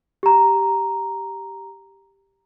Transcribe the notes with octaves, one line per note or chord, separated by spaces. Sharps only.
G4 A#5